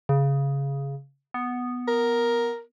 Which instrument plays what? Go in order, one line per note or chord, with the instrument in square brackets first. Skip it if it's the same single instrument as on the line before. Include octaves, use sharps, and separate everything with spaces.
[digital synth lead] C#3
B3
[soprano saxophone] A#4